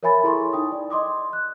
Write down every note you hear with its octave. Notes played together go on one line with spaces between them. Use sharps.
A#4 C#5 E5 G#5 B5 A6
E4 G#4 A4 A#5 C6 C#6
D#4 G5 D#6
D5
D#5 C6 D6 D#6
F#6